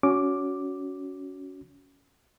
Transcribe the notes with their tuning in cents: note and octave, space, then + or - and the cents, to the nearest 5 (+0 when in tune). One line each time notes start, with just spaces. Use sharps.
C#4 +20 F#4 +0 D6 +0